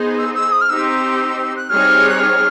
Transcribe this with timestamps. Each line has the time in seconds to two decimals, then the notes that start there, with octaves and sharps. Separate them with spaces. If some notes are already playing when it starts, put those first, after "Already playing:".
Already playing: B3 D#4 G#4 C5
0.18 E6
0.35 E6
0.52 D#6
0.61 F6
0.69 C4 D#4 G4 C5 E6
1.56 F#6
1.69 G3 C4 D#4 G#4 C#5 F6
2.09 F#6
2.20 F6